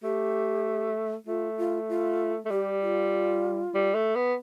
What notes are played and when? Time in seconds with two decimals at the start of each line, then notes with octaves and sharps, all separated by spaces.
0.03 A3 G4
1.27 A3 F4
1.58 F4
1.89 F4
2.45 A3
2.50 G3 G4
2.82 F4
3.75 G3
3.94 A3
4.16 B3